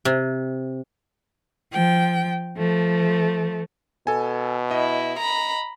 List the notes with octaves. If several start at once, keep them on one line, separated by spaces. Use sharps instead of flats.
C3
F3 G5
F3 A3
B2 A4 G#5
E4 D#5
A#5 B5